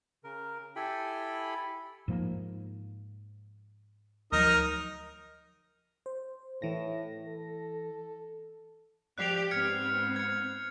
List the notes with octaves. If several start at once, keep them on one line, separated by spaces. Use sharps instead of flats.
C#3 A#4
E4 G4 A4 G5 G#5 B5
G#2 F3 A#3
D2 F3 F#3 D#4 A#4 D#5
C5
A2 E3 A#6
A4
F3 G4 D5 F#6 C7 F7
G#2 B3 C4 F6 G#6 C#7
G#6 C#7